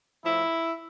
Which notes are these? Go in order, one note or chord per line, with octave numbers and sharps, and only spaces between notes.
A2 F3 E4